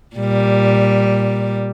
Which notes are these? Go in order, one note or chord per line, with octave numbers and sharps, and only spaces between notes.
A#2 G3